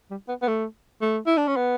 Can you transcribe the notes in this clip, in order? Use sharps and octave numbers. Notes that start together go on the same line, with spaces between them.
G3
B3
B3
A3
A3
E4
D4
C#4
B3